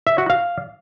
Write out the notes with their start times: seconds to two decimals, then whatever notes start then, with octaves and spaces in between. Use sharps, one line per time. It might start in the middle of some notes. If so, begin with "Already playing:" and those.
0.07 E5
0.18 F#4
0.30 F5